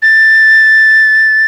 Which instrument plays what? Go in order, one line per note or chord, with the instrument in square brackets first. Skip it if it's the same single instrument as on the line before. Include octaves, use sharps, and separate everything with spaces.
[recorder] A6